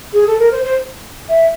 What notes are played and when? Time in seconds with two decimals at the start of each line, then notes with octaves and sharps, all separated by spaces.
0.13 G#4
0.27 A4
0.39 A#4
0.52 C5
0.64 C5
1.29 E5